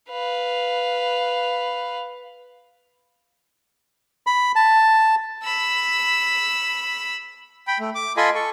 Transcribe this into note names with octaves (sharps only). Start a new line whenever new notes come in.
B4 F5
B5
A5
B5 E6
G5 B5
A3
D6
F4 A4 D#5 G#5 B5 C6
A4 C#6